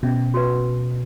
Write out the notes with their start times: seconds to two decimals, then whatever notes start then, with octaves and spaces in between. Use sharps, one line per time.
0.03 B2 C#4
0.34 F#4 B4